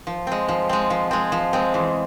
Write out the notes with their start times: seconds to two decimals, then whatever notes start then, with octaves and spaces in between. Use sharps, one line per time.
0.07 F3
0.27 G#3 C4
0.48 F3
0.69 G#3 C4
0.90 F3
1.11 G#3 C4
1.32 F3
1.53 G#3 C4
1.74 E2